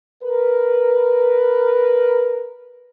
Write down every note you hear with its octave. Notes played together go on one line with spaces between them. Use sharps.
A#4 B4